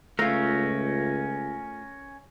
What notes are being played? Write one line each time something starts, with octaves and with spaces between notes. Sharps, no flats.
C#2 A3 C#4 F4 A#4